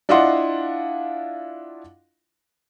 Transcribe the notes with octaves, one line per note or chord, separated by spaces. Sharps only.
D4 E4 F4 D#5 F#5 C6